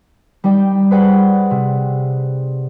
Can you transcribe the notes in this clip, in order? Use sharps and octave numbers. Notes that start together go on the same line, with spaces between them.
G3 D#4 D5 G5
G#4 B4 C5 D5 F#5 G5
C3